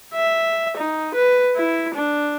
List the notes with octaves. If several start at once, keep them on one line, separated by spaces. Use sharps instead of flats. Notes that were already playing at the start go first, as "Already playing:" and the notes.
E5
D#4
B4
E4
D4